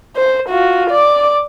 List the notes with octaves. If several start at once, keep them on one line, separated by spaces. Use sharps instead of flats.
C5
F4 F#4
D5 D6